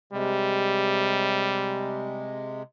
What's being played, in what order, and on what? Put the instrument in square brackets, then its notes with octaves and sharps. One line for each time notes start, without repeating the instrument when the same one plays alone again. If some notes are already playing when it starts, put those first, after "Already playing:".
[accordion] C3 G#3 [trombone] G3